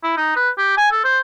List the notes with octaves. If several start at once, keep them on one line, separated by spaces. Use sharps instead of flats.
E4
D#4
B4
G4
G#5
A4
C5